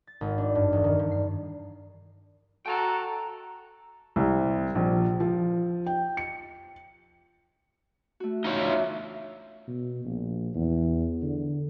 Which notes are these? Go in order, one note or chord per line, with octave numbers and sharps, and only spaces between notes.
A6
G#1
D4
G2
E1
D#3
G2
C7
F#4 A4 G5 A5 A#5
C2
A#1
F3
G5
C#7
A3 F#4
C#4 D#4 F4 C#5 C6
D4 E5
B2
A#1
E2
D3